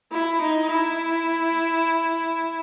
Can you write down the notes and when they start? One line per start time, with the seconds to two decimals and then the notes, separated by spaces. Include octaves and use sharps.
0.11 E4
0.41 D#4
0.71 E4